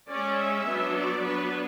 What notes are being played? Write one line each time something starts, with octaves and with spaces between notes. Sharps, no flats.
G#3 C#4 D5
E5
F#3 B3 D4
D5
F#3 B3 D4 B4